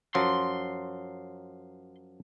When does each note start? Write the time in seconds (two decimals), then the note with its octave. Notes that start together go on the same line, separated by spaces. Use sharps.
0.15 F#2 F3 F#3 C6